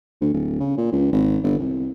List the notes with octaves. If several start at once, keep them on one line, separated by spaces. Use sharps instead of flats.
D2
D1
C#3
A#2
C#2
G#1
G1
C2